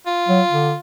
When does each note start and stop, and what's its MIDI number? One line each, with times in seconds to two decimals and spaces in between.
0.06 0.79 65
0.29 0.42 54
0.49 0.73 50